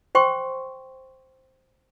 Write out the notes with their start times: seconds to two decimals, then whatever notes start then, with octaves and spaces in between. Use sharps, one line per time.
0.15 C5 G5 C6 C#6